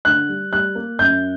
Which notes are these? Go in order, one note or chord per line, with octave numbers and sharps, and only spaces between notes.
D3 F#6
G3
G3 F#6
A#3
F#2 G6